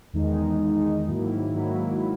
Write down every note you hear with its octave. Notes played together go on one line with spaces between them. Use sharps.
E2 D#3 G#3 D#4
E2 D#3 G#3 D#4
G#2 D#3 F#3 A#3 E4
G#2 D#3 F#3 A#3 E4